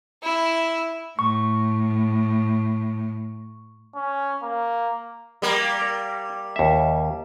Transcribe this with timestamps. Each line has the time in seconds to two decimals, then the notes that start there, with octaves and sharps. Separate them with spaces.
0.23 E4
1.19 A2 C#6
3.95 C#4
4.43 A#3
5.42 G3 A#3
5.81 A#4
6.56 D#2 E5